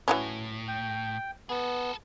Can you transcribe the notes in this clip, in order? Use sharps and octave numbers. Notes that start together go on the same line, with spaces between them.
A2 E3 F#3 C#4
G5
B3 G#4 A4